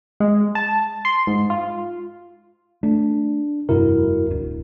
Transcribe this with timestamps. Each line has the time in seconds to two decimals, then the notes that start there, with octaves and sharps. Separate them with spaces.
0.20 G#3
0.55 A5
1.05 C6
1.27 G#2
1.50 F4
2.83 A3 D4
3.69 F1 G2 C3 E4 F#4 A#4
4.31 D1 D4